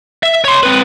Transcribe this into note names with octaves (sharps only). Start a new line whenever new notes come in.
E5
C#5 C6
C4 B4